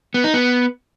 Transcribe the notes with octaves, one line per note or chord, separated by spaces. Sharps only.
B3
D#4
B3